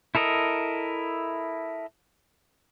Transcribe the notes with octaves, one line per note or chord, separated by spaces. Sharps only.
E4 A4 A#4 D#5